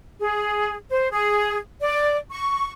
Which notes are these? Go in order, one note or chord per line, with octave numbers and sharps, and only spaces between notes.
G#4
C5
G#4
D5
C#6